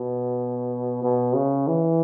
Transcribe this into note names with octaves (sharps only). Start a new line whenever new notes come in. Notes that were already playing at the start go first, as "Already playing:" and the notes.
Already playing: B2
B2
C#3
E3